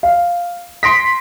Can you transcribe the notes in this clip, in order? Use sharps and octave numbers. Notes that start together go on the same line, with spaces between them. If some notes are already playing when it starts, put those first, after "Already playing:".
F5
C6 D#6 A#6 B6 D7